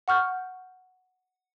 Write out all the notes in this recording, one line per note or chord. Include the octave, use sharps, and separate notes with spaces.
F#5 C#6 F6 G6